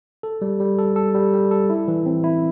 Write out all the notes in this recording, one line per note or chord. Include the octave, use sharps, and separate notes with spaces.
A4
G3
G3
A4
A4
G3
G3
A4
E4
E3
C4
E4